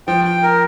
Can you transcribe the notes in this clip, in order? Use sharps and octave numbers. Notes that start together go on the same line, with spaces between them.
F3 G5
G5
A#4